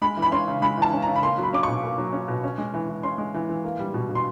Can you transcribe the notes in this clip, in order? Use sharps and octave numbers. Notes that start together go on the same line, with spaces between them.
G#3 B5
E3
B5
C#4 C6
C#3
G#3 B5
E3 A5
C#4
A#5
C#3
B5
A#3 C6
F#3
B5
C#4 D6
B2 C#6
A#3
F#3
C#4
B2
C#4
G#3
E3
E3
C#4 C6
G#3
E3
E3
A#3
G3
B2
B2
C6